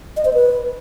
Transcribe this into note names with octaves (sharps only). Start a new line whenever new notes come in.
D#5
C5
B4